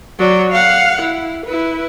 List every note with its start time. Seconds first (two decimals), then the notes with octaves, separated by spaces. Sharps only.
0.19 F#3 D5
0.52 F5 F#5
1.01 E4
1.46 E4 B4